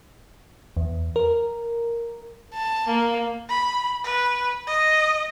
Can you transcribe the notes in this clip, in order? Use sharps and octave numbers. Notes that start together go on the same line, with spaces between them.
E2
A#4
A5
A#3
B5
B4
D#5